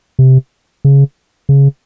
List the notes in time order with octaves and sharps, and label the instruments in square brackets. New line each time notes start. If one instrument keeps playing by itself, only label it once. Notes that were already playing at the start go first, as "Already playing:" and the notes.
[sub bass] C3
C#3
C#3